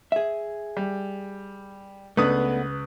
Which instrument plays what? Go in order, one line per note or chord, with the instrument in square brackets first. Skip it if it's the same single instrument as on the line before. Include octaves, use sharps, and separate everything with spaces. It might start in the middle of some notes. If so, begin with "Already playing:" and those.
[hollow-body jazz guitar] G#4 E5
[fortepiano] G3
[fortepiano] C#2 B4 D#6 [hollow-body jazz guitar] A3 B3 D4